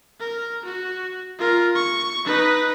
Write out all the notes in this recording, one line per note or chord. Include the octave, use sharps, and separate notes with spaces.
A#4
F#4
F4 A#4
C#6
D#4 B4